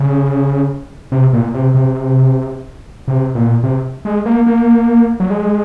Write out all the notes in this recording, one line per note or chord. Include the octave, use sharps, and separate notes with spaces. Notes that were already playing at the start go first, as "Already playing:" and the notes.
Already playing: C#3
C3
A#2
C3
C3
C3
A#2
C3
G#3
A#3
A#3
F#3
G#3